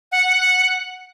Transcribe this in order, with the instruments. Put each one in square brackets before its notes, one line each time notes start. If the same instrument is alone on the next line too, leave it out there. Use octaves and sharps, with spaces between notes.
[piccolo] F#5